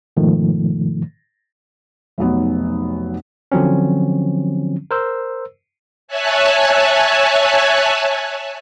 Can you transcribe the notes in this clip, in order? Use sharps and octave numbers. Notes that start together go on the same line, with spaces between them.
G#2 B2 D#3 F3 A3
F1 B1 F#3 B3
D3 F3 F#3 C4 C#4
A#4 C5 E6
C#5 E5 G#5 A5 F#6